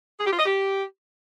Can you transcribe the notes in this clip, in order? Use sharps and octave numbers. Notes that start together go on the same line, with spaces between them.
G#4
G4
F4
D#5
G4